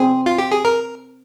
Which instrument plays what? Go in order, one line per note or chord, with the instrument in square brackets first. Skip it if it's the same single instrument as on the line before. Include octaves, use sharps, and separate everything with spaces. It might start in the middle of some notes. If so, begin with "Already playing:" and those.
Already playing: [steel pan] C4 [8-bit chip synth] G#4
[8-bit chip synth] F4
G4
G#4
A#4